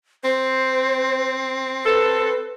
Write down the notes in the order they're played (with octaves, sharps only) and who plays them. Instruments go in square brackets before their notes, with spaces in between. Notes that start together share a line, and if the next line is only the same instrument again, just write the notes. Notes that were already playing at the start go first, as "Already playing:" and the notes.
[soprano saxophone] C4 [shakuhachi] C5
[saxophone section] A4 [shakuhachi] B4